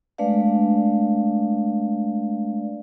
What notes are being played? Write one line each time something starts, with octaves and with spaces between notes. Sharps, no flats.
G#3 A3 D4 B4 D5 F5